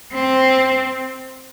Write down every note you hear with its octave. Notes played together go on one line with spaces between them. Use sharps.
C4